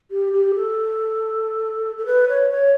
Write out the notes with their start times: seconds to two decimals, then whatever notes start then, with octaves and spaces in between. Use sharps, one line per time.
0.11 G4
0.33 G4
0.55 A4
1.98 A4
2.06 B4
2.29 C#5
2.50 C#5